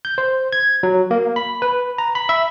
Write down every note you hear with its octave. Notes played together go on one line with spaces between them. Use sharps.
G6
C5
G#6
F#3
A#3
B5
B4
A#5
B5
E5